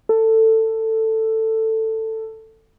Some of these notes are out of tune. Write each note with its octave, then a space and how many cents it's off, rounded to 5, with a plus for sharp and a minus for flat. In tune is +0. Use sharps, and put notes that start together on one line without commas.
A4 +15